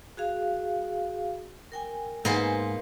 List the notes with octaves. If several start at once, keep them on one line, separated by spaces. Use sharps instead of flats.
F#4 G#4 F5
A#4 G5 G#5
G#2 A#3 B3 C5 G#5